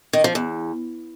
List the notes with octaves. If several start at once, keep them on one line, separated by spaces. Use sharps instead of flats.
D#3
F3
E2